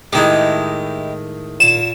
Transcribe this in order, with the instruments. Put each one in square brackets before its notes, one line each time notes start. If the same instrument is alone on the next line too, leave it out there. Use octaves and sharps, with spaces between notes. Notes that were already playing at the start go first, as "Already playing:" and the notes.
[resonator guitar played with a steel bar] A2 D#3 G#3 [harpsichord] D#4 E4 G4
[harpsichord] A#2 [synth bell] E7